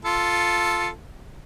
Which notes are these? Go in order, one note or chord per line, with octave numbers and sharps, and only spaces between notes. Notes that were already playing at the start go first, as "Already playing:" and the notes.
F4 A4